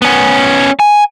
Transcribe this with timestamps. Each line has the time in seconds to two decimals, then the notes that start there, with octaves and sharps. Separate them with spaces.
0.02 B3 C#4
0.80 G#5